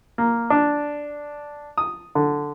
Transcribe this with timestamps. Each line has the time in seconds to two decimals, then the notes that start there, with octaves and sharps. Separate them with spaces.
0.18 A#3
0.50 D4
1.78 D#6
2.15 D3